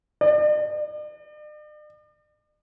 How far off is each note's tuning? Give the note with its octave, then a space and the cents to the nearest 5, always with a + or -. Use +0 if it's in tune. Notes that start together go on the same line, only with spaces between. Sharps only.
D5 +45